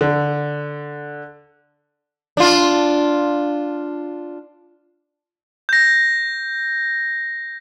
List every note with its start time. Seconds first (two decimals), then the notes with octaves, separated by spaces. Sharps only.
0.01 D3
2.37 D4 F4
5.69 G6 A#6